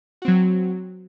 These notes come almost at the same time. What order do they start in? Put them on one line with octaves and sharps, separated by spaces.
F#4 C4 F#3